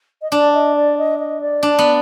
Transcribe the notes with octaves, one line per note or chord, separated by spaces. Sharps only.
D#5
D4 D5
D#5
D5
D#5
D#5
D5
D4
B3